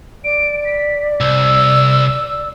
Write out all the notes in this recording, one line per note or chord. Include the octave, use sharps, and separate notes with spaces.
D5 D7
B6
C2 E6